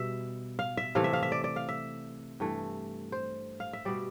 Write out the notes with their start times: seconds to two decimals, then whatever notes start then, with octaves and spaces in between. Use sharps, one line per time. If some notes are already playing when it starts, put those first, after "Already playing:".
Already playing: B2 G3 E5
0.59 F5
0.77 E5
0.95 C3 E3 A3 F5
1.04 E5
1.13 F5
1.23 E5
1.32 D5
1.44 D5
1.56 F5
1.69 E5
2.40 G2 E3 A3
3.12 C5
3.60 F5
3.73 E5
3.85 B2 G3 D5